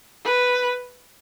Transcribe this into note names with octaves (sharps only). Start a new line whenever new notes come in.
B4